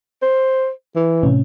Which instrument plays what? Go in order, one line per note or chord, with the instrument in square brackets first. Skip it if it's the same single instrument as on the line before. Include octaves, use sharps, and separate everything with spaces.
[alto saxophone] C5
E3
[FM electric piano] A2 C3 C#4